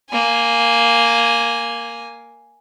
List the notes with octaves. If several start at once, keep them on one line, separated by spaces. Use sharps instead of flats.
A#3 G#5